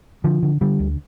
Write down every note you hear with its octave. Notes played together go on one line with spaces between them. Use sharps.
D3 F3
D3
D3 G3
D2